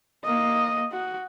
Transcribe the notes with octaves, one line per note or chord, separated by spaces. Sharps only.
A#3 D#5
F#4